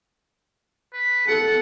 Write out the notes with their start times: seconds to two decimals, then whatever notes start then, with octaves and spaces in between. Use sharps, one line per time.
0.93 B4
1.27 A4 F#5